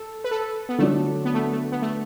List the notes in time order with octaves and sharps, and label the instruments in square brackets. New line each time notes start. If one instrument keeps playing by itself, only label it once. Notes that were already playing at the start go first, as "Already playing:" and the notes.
Already playing: [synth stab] A4
B4
A4
B3
[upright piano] D3 F#3 D4 [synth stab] A3
[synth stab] B3
A3
A3
B3
A3